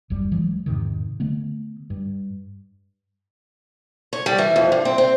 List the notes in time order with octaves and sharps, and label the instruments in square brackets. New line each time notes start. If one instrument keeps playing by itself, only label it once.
[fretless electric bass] F#1 D#2 G3
E3 F#3 G#3
E2 G#2 C3 D#3
D3 A3 B3
G2
[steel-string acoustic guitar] C#5
G3
E3
F2
G2
C4
C4